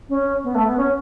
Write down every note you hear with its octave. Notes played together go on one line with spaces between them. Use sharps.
C#4
B3
A3
B3
C#4